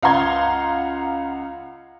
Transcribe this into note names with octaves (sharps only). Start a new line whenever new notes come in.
C#2 F5 F#5 A#5 C6 G#6